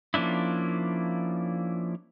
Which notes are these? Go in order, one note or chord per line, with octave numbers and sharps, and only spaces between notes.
F3 A#3 C#4 D4 E4